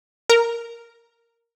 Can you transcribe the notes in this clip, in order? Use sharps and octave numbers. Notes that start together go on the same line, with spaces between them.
A#4